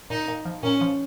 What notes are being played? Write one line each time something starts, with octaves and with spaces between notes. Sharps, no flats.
A#2 D#4
A#2
F3
A#2 C#4
F3